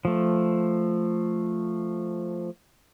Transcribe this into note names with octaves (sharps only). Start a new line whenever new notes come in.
F3 A3